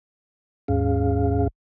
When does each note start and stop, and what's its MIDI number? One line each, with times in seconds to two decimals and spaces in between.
0.68 1.48 39
0.68 1.48 44
0.68 1.48 61
0.68 1.48 68
0.68 1.48 77